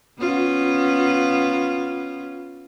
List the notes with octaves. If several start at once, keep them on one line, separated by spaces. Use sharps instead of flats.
B3 C#4 F4